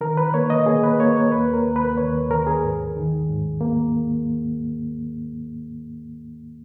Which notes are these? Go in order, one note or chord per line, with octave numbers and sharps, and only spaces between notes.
D#3 A#4
B4
A#3 C#5
D#5
A#3 G#4
B4
A#3 C#5
C#5
D#2 B4
A#4
D#2
B4
D#2 C#5
D#2 A#4
G#4
G#2
D#3
G#2
A#3